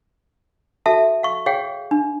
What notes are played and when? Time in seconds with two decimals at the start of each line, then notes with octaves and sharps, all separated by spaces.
0.86 F#4 A4 E5 A5
1.23 F5 C#6
1.46 G#4 C#5 F5 G5
1.91 D4